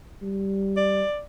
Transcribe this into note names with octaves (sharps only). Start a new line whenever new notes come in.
G3
D5